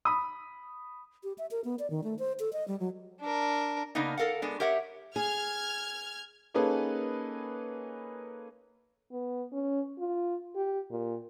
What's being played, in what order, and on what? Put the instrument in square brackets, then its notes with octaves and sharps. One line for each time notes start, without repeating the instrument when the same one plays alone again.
[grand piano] B5 D#6
[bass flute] G4
E5
A#4
B3
D5
D#3
A3
C5
A4
D#5
G3
F#3
[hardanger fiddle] D4 A#4
[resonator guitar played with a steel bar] C#3 A#3 B3 D4 D#4
A4 A#4 F5 F#5
G#3 B3 D4
G4 A#4 C#5 E5 F#5
[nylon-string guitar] G#4 [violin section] F6 G#6
[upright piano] A#3 C#4 D#4 G#4 A4 B4
[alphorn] B3
C#4
F4
G4
A#2